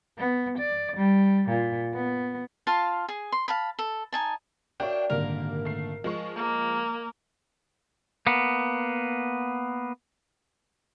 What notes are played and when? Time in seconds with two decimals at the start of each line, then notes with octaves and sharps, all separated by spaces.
0.18 B3
0.58 D5
0.96 G3
1.49 A#2
1.94 B3
2.67 F4 F5 A5
3.09 G#4
3.32 C6
3.48 F5 A5 B5
3.79 A4
4.12 D#4 G#5 A5
4.80 D4 F#4 A#4 C#5 E5 F5 G5
5.10 G#1 A#2 D3 G3 A#3 A#4
5.65 A3 C7
6.04 F3 G#3 D#5 C#6
6.36 A#3
8.27 A#3 B3